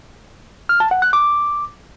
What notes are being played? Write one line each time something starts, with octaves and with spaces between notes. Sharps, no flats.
F6
A5
F#5
F#6
D6